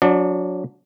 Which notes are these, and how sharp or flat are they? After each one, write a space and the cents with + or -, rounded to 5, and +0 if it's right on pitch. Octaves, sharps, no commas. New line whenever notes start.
F#3 -25 D4 -30 D5 +30